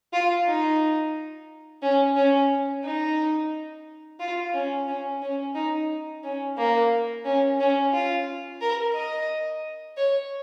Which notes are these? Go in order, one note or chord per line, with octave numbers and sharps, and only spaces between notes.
F4
D#4
C#4
C#4
D#4
F4
C#4
C#4
C#4
D#4
C#4
A#3
C#4
C#4
F4
A#4
D#5
C#5